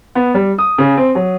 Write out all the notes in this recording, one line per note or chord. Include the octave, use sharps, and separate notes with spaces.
B3
G3
D#6
C#3
C4
F#3